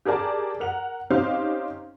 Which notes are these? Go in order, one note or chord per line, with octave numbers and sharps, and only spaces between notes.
G4 G#4 A#4 D5 A5
A#4 F#5 F7
C4 C#4 D#4 G4 C5 F5